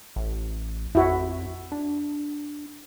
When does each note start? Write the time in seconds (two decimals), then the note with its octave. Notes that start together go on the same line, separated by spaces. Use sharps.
0.16 A1
0.95 F2 E4 F#4
1.72 D4